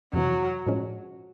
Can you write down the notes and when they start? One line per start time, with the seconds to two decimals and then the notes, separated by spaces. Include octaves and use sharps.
0.13 F2 C3 E3 F#3
0.66 A2 F3 G#3 C#4